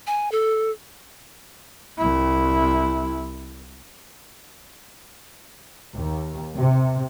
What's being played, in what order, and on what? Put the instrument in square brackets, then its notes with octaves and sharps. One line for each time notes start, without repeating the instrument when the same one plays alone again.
[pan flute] G#5
A4
[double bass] C2 E4
[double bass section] D#2
C3